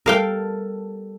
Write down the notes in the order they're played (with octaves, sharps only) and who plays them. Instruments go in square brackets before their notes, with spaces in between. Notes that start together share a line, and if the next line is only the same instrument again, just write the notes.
[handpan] G3 B3 A4 [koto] A#4 F5 G5